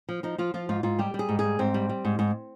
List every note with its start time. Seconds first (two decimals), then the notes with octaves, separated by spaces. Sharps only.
0.09 F3
0.23 F3 D#4
0.38 F3 F4
0.54 F3 F4
0.69 G#2 F4
0.83 G#2 F4
0.99 G3 G4
1.14 G3
1.19 G#4
1.29 G#2
1.39 G3 G#4
1.59 G#2 C4
1.74 G3
1.89 G3
2.05 G#2
2.19 G#2